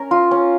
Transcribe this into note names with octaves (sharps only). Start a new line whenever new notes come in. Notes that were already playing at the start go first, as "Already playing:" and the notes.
Already playing: C#4 A#4
F4
C#4